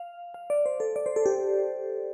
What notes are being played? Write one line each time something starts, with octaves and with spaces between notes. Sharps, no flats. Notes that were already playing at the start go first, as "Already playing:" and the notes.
Already playing: F5
F5
D5
C5
A4
D5
C5
A4
G4